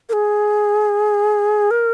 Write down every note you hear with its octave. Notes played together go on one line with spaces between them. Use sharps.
A#4
G#4
A#4